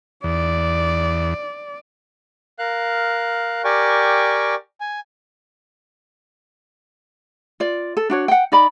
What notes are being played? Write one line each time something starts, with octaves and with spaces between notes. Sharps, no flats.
E2 D5
A#4 F5 F#6
G4 A#4 D5 G5 G#5 C#6
G#5
F4 D5
A4
D4 F#4 C#5
F#5 G5
D#4 D5 B5